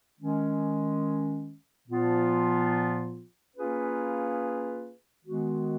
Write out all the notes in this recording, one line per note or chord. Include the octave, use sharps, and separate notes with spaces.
D#3 G#3 C#4
A#2 F3 B3 F4
A#3 C#4 F4 G#4 B4
D#3 G#3 B3 F#4